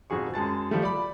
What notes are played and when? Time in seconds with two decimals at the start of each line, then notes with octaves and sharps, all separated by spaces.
0.10 D#1 F2 F#4 G#4 C#6
0.34 F#2 G#3 A5 A6
0.71 F3 G3 A3
0.83 D5 B5